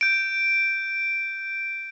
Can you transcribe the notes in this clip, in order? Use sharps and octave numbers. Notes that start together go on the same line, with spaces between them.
G6 D7